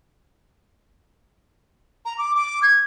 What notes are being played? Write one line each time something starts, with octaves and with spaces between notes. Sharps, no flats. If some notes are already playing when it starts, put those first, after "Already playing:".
A#5
D6
D6
G#6